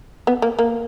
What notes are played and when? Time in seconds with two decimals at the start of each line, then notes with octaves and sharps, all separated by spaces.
0.27 B3
0.42 A#3
0.59 A#3